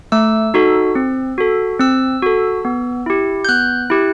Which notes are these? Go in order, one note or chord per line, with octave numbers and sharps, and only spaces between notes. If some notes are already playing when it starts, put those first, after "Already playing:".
A3 E6
D#4 F#4 A4
C4
F#4 A4
C4 E6
F#4 A4
B3
E4 G4
G6
B3 F#6
E4 G4